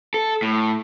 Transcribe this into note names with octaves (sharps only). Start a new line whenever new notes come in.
A4
A2